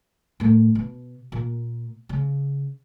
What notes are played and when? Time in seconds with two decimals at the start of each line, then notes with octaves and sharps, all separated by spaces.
0.40 A2 A#3
0.75 B2
1.32 A#2 A#3
2.09 C#3